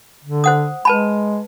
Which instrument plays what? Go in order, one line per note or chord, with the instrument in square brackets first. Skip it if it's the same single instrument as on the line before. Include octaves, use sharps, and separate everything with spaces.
[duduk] D3
[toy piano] C5 F#5 D#6
[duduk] G#3 [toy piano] B4 A5 B5